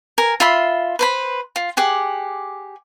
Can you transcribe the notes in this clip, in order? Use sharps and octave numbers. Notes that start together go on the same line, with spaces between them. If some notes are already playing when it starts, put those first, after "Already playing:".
A#4 G#5
F4 E5 B5 C6
B4 C5 B5
F4
G4 G#4 F#5